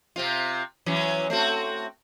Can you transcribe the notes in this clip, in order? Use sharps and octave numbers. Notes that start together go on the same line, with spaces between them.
C3 C4 F4
E3 F#3 C#4
A3 C4 F#4